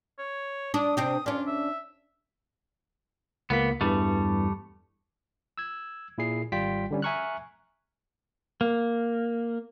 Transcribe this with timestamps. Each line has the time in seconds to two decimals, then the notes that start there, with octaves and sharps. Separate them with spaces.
0.18 C#5
0.74 D4 D#6
0.97 C3 C4 D4 D#6
1.26 C#4 D4 F4
1.47 E5
3.50 C#2 A#3 B3 B6
3.81 E2 G2 E3 G3 A3
5.58 E6 G#6
6.18 A#2 E4 G#4 C7
6.52 G#1 G3 F4 G5 B6
6.91 D3 G3 C#4
7.02 E5 G#5 A#5 C#6 F6 F#6
8.61 A#3